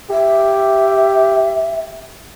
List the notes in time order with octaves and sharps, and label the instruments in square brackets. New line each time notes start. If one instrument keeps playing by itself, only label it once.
[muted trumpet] G4 [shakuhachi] E5